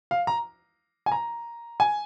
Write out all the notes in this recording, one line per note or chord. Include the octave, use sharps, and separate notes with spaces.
F5
A#5
G#5
A#5
G#5